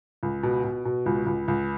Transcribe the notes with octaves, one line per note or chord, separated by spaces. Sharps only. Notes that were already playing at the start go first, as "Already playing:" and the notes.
C#2
B2
B2
B2
C#2
C#2
C#2